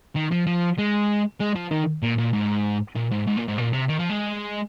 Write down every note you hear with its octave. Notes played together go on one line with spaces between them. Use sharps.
D#3
F3
F3
G#3
G#3
F3
D#3
A#2
A#2
G#2
A#2
G#2
G#2
A#2
G#2
A#2
C3
D#3
F3
G#3